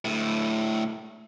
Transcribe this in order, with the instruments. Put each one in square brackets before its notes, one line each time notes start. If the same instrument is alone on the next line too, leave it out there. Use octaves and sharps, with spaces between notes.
[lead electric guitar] D2 A2